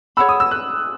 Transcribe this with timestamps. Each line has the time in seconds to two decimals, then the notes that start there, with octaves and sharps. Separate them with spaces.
0.17 G#4 C#5 F#5 B5 E6
0.29 D#6
0.40 E6
0.51 F#6